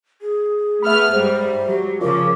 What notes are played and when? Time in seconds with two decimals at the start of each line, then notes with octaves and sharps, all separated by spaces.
0.22 G#4
0.82 A3 B3 E5 B5 F6
1.12 G#2 G3 C5
1.67 F#3 G4
2.01 C#3 F3 F4 A#4 C#5 D6